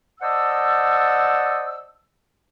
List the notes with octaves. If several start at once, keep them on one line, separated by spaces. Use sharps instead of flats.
C5 D5 D#5 F#5 A5 E6